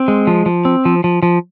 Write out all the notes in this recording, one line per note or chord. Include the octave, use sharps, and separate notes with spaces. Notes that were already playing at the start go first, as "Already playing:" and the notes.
Already playing: C4
G#3
F3
F3
C4
F3
F3
F3